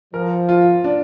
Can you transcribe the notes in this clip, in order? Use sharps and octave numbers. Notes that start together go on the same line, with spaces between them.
F3 A#4
F4
D4